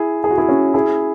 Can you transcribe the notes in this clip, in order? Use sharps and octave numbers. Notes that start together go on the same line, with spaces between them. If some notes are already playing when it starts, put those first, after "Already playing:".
Already playing: E4 G#4
G#4
F#4
E4 G#4
C#4 F#4
E4 G#4